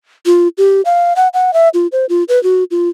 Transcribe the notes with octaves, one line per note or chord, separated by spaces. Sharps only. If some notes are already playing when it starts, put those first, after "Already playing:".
F4
G4
F5
F#5
F#5
E5
F4
C5
F4
B4
F#4
F4